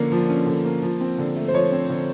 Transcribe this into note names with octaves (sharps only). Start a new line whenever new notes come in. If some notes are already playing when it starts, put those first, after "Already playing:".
Already playing: D3 F3 A#3 C#4
F3
C#4
D3
A#3
F3
C4
D3
A3
C5
F3 C#5
C4
D3